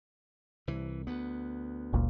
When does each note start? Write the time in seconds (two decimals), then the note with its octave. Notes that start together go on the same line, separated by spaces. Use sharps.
0.67 C2 E3
1.07 D2 B3
1.93 F#1 C#2 A#2